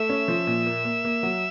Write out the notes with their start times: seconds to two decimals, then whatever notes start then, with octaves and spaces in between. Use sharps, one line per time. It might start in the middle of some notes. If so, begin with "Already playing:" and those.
Already playing: A3 E5
0.09 C#4
0.28 F3
0.47 A#2
0.66 A#3
0.85 A#3
1.04 A#3
1.23 F#3